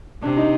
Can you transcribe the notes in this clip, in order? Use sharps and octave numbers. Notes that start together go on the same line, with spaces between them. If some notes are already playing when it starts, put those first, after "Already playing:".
C3 D4
D#4